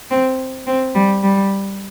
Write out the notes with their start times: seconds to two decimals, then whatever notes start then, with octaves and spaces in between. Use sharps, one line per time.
0.11 C4
0.67 C4
0.95 G3
1.23 G3